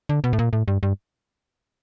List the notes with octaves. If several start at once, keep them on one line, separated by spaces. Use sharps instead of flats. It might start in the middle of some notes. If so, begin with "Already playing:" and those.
D3
B2
A2
A#2
A2
G2
G2